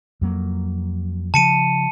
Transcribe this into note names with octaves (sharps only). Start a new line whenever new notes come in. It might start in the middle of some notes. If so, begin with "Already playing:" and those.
F2 F#3 A#3
C#3 F3 A5 C#7 D#7